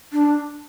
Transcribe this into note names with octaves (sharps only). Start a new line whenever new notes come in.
D4